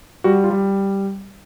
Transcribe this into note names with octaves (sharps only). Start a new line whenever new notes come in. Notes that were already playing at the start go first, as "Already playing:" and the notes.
G3 F#4
F4
G3